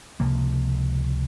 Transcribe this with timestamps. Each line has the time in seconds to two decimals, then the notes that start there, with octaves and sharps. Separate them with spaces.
0.20 C#2 C3 F3 A#3